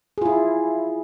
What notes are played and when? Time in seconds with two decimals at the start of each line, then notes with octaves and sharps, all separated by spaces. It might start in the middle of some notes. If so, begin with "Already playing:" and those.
0.18 G#4
0.22 F4
0.25 E4